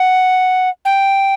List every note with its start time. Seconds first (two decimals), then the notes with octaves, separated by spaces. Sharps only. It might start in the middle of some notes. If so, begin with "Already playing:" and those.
Already playing: F#5
0.85 G5